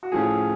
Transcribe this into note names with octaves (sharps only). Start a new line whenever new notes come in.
F#4
A2 F3 A3 C#4 G#4